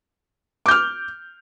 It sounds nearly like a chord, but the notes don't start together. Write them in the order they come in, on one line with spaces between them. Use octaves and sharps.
D6 G6 F6